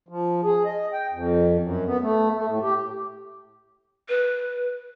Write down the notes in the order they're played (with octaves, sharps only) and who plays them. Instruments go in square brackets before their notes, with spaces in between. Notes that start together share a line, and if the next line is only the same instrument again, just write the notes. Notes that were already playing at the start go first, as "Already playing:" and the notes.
[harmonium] F3
G#4
D#5
G5
F2
F#2
B3
A3
A3
A2
G4
[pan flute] B4